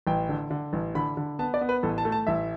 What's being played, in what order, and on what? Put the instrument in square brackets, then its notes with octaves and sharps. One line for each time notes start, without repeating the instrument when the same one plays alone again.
[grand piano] A1 G5
D3
D3
A1
D3 B5
D3
B3 A5
D5
B3
B4
A1 A4
A5
A3
A5
A1 E5